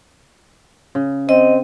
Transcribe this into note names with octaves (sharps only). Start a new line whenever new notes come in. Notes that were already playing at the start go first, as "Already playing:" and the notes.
C#3
C4 D#5